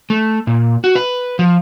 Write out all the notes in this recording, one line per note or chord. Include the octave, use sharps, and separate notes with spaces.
A3
A#2
F#4
B4
F3